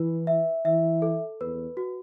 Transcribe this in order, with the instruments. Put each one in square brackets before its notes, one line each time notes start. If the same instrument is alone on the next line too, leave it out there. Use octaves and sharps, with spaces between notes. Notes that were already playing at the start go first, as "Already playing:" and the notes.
Already playing: [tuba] E3 [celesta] E4 B4
[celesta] E5
[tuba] E3 [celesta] E5
[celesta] A4
[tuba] E2 [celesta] B4
[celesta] F#4